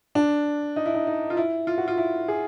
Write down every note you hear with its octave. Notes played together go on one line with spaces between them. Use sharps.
D4
D#4
E4
D#4
D#4
F4
E4
F4
F#4
F4
E4
G#4